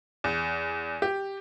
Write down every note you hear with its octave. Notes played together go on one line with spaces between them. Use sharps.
E2
G4